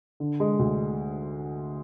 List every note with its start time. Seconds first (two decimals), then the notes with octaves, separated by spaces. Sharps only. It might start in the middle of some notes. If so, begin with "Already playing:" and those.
0.20 D3
0.40 G#3
0.59 D2